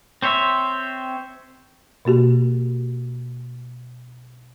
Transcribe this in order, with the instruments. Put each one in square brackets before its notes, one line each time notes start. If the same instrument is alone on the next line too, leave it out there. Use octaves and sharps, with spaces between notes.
[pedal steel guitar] C4 C5 C#5 E5
[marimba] B2 A#3 F#4 G4